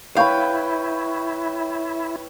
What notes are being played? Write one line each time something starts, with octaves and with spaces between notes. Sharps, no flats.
E4 B4 C#5 F5 G5